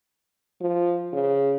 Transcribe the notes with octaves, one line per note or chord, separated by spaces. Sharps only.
F3
C#3